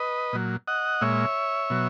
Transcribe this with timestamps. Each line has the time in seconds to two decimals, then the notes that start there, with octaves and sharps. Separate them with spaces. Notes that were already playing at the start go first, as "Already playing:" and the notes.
Already playing: B4 D#5
0.33 A#2 F#3
0.68 D#5 F#5
1.01 A#2 G#3 C#5 E5
1.70 B2 F#3